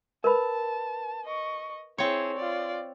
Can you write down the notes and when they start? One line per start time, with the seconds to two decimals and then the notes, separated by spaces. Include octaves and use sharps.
0.24 A#4 B4 A5 B5
1.25 D#5 C#6
1.98 C4 E4 G#4 C#5
2.37 F4 D5